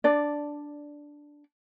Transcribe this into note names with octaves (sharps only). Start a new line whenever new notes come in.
D4 D5